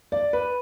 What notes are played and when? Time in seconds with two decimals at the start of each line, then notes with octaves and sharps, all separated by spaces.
0.12 D5
0.33 B4